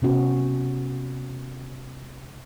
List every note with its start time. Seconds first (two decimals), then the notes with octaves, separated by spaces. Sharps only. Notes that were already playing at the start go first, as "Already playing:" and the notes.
0.02 C3 B3 C#4 F#4